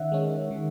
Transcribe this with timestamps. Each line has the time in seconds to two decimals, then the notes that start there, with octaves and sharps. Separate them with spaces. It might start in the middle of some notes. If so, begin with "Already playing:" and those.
Already playing: D#3 C#4 E5 F#5
0.12 G#3 C#4
0.51 D#3